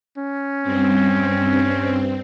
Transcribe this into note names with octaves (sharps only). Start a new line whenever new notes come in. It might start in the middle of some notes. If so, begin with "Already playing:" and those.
C#4
G2 C4